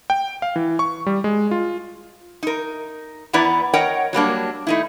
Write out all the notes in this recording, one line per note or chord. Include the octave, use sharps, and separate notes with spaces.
G5
F5
E3
C#6
G3
G#3
F4
D#4 A#4
E2 B3 E4 D5 A#5
A#4 C#5 D#5 F#5 G5
F#3 G3 A#3 D4
A3 D#4 E4